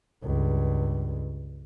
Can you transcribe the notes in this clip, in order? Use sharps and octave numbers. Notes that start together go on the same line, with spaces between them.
C#2 G2